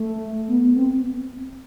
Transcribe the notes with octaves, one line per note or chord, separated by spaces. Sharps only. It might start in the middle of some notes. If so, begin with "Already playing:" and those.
Already playing: A3
B3
B3
C4